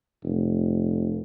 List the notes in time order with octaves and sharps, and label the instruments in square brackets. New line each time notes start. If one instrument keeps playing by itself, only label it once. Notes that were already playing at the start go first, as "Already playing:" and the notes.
[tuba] F1